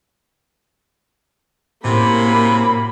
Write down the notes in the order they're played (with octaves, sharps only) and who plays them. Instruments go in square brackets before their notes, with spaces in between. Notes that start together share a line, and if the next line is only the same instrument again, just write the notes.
[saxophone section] F#2 C3 [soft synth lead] A2 [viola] A#3 B5